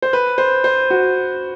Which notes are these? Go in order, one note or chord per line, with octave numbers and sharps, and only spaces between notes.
C5
B4
C5
C5
F#4